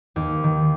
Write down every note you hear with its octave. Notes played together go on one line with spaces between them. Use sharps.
D#2
D#3